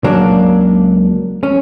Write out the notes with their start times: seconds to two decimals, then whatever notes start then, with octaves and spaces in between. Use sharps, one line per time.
0.04 C#2 F#3 A#3 D4
1.43 C#4